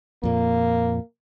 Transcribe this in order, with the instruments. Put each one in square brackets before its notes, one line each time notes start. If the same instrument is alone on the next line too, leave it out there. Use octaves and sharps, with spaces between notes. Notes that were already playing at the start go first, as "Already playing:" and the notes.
[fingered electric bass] F2 A#2 [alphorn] A#3